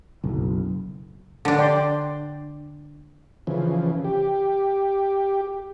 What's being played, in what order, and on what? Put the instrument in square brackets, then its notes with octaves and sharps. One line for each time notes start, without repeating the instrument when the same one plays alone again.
[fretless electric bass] F#1 B1
[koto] D3 D4
[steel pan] D5 G5 C6
[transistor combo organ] C#3 E3 F3
G4